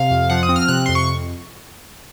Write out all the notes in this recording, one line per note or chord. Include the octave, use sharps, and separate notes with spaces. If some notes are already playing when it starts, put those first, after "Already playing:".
Already playing: C3 F5
F2
F3 F#5
D#6
C4
F6
C3 F#6
F2 C6
C#6